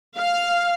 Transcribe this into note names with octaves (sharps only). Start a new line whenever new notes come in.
F5